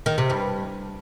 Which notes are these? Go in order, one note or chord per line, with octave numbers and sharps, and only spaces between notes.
D#3
C3
G2